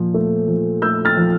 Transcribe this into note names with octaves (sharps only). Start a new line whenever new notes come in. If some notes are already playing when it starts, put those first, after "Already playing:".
Already playing: A#2 F3
A3
F3
A3 E6 G6
F6 A6
F3